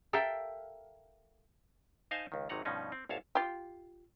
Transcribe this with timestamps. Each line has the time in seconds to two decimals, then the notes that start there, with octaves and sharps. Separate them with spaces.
0.13 A4 A#4 E5 F5 G5
2.11 D#4 C5 D#5 F5 G#5 A5
2.32 C#2 D#3
2.49 G#1 C3 F#3 D#4 F#5 A#5
2.65 G2 B2 F3 C#4 D#4
2.92 C4
3.09 G1 D2 C#5 F5 A5
3.35 F4 G4